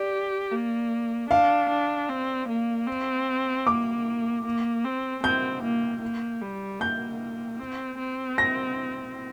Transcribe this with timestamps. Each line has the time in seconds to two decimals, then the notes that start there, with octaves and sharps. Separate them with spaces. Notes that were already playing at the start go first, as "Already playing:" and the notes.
Already playing: G4 D5
0.52 A#3
1.30 D4 F5
1.70 D4
2.09 C4
2.49 A#3
2.88 C4
3.67 A#3 D6
4.45 A#3
4.85 C4
5.23 C4 G6
5.63 A#3
6.02 A#3
6.42 G3
6.80 A#3 G6
7.59 C4
7.99 C4
8.38 A#6